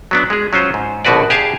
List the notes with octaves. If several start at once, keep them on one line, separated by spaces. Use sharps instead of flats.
F#3 B3 D4
G#3 G#4
F#3 C#4 F4 C5
G#2
A#1 B2 D3 F#4 B4 D5
G4 G#4 F5 G#5 A5